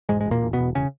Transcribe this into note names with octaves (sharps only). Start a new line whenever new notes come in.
E1 G#2 G#3
G#3
E1
A#2 A#3
E1
B2 B3
E1
C#3 C#4